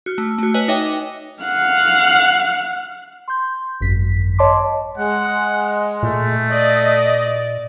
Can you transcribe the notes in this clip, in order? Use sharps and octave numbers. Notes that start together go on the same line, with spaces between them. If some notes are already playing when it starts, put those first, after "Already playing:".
F#4 F6 F#6
A3
A3 F#4
B4 C#5 D#5 G#5 F#6
D#4 C#5 D#5 E5 G5 D6
F5 F#5
C6 G6
G#1 F#2 B6
C#5 D#5 A5 C6 D6
G#3 F#5
A#2 A3
D5 D#5